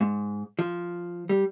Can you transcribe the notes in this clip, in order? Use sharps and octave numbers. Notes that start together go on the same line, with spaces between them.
G#2
F3
G3